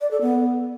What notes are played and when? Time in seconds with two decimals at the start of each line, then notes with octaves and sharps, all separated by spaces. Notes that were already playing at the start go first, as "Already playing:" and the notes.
0.01 D5
0.11 A4
0.21 B3